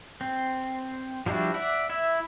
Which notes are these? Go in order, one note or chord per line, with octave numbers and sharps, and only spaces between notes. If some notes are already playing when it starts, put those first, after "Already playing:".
C4
F3 G3 D4 E4 F#4
D5 E5 F#5
E4 E5